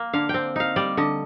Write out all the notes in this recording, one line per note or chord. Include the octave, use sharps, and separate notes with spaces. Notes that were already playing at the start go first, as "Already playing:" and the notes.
Already playing: A#3
D3 F5
C4 G5
D#4 F5
G3 D5
D3 D#5